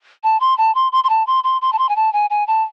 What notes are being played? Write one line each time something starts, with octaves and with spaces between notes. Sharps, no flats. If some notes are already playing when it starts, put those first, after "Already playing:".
A5
C6
A5
C6
C6
C6
A5
C6
C6
C6
A5
C6
G#5
A5
G#5
G#5
A5